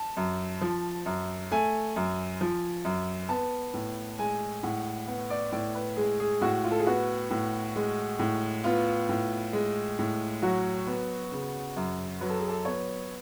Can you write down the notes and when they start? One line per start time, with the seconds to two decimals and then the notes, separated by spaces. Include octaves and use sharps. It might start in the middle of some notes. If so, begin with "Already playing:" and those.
Already playing: A5
0.17 F#2
0.61 F3
1.06 F#2
1.51 A3 G#5
1.96 F#2
2.41 F3
2.85 F#2
3.29 B3 A5
3.74 A2
4.19 G#3 G#5
4.63 A2 F#5
5.07 B3 F#5
5.30 D5
5.52 A2 D5
5.75 B4
5.96 G#3 G#4
6.20 G#4
6.41 A2 F#4
6.64 F4
6.71 A4
6.79 G#4
6.87 B3 F#4
7.31 A2
7.76 G#3
8.19 A2
8.64 B3 F4
9.09 A2
9.53 G#3
9.99 A2
10.42 F#3 F#4
10.87 B3
11.32 C#3
11.77 F#2
12.20 F#3 B4
12.29 A4
12.39 G#4
12.48 A4
12.65 B3 C#5